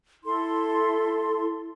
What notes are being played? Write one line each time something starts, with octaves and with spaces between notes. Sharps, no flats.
E4 A4 C6